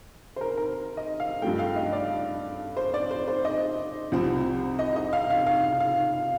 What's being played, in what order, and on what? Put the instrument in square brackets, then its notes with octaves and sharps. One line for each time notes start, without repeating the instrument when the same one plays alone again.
[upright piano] C5
A#4
A#4
D#5
F5
G2 F3 A3 G5
F5
D#5
D5
C5
D5
C5
C5
D#5
C2 C3 F3 C4
D#5
D#5
F5
F5
F5
F5